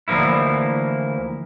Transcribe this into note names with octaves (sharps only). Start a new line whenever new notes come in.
D2 E3 F3 A#3 E4